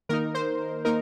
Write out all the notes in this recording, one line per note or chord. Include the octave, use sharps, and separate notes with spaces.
D#3 A#3 D#4 A#4
C5
A#3 D#4 A#4